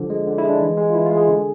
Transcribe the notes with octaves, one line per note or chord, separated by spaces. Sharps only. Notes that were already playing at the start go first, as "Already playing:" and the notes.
Already playing: D3 F3
G#3
D3
E4
G#3
D4
E3
G#3
F4
E3 E4
F4
G#3
G#4
D3